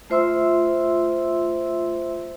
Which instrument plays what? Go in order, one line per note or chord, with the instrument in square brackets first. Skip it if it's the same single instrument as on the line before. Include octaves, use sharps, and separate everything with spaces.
[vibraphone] A3 F4 C5 E5 C6 E6